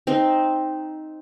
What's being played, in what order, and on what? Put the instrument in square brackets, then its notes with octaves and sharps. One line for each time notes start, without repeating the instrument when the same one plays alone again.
[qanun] C4 D#4